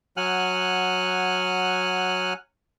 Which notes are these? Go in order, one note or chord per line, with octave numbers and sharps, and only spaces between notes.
F#3 F#5 G#5 F6 F#6